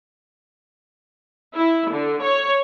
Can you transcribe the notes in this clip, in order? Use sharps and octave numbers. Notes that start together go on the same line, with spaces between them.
E4
D3
C#5